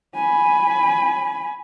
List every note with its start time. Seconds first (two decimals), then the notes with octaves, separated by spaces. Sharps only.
0.15 G#5 B5